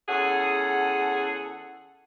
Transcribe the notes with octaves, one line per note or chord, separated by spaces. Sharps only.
E2 C#4 G#4 A4 F#5